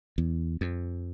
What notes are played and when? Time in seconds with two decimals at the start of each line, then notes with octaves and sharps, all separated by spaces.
0.18 E2
0.61 F2